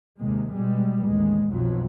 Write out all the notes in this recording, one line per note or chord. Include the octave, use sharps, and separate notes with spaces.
D#2 C3 G#3
B2 G3 G#3
A1 D#2 G#3
B1 F2 F3 F#3